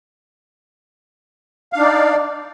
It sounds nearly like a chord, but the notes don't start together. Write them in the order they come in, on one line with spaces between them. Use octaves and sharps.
F5 D4 D#4 D5